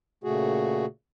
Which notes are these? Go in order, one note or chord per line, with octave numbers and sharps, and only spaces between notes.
A#2 C#3 A3 F#4 G#4